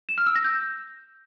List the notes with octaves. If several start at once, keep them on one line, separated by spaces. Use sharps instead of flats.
E7
F6
E6
A#6
G6